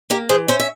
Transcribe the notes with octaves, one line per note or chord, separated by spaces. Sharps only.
A#3 G4 A#4
E3 G#4 C5
C#4 C5 E5
E5